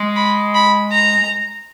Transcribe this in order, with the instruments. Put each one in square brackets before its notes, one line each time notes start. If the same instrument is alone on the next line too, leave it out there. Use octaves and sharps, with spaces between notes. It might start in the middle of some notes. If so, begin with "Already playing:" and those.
Already playing: [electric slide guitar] G#3
[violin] B5
B5
A#5